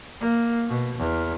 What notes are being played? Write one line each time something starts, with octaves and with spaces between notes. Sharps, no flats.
A#3
B2
E2